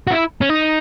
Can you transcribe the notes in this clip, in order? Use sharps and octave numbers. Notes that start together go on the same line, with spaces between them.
F#4
E4
C#4
D#4